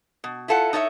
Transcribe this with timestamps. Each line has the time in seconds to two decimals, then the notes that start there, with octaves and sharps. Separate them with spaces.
0.24 B2
0.48 E4 F4 A4 B4 F#5
0.73 D#4 A4 C#5 D#5 E5